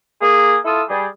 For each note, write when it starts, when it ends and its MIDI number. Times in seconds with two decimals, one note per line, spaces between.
0.22 0.57 58
0.22 0.57 68
0.65 0.82 64
0.65 0.82 65
0.65 0.82 69
0.65 0.82 87
0.65 0.82 88
0.89 1.06 55
0.89 1.06 68